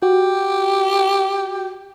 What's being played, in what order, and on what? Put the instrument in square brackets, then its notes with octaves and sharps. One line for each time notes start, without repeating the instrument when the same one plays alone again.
[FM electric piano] F#4 [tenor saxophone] G4